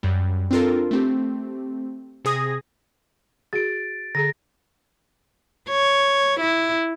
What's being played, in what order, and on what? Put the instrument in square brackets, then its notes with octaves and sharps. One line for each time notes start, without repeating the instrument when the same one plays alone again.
[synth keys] F#2 G3
C4 D4 F4 A4 A#4
A3 C4 G4
C3 G#4 D#6 G#6 A#6
[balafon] F#4 G#4 [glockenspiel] A6 D7
[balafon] D3 G#4 A#5 [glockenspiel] A#6
[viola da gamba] C#5
E4